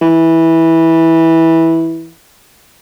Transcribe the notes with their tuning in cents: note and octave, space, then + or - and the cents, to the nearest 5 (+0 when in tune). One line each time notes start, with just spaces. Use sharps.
E3 -10